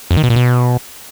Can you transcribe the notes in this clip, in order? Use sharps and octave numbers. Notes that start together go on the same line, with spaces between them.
F2
D#3
B2
A#2
B2